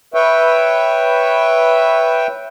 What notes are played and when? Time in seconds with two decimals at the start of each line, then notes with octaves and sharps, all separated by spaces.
0.14 B4 C#5 E5 G5